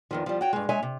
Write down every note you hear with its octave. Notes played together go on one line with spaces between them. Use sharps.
E2 D#3 F3
F3 G3
F#4 C#5 G5
G2 G#3
G#3 C#5 E5 G#5
C3